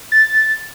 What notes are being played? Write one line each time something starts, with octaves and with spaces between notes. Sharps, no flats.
A6